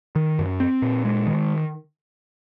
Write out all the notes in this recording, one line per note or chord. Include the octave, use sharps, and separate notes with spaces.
D#3
F#2
C4
A#2
G#3
D#3